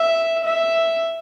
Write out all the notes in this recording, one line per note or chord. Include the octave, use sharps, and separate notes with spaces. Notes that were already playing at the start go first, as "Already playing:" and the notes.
Already playing: E5
E5